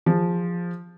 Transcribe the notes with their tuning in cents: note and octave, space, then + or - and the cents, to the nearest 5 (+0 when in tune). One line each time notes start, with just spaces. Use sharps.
F3 +0 G#4 -30